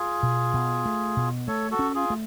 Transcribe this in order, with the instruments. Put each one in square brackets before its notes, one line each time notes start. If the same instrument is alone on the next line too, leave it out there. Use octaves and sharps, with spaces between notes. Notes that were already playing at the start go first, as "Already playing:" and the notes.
Already playing: [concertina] F4 G#4
[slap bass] B2
B2
A3
B2
[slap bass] A3 [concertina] A4 C#5
[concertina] F#4 A4
[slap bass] C#4
[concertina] F4 G#4
[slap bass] A3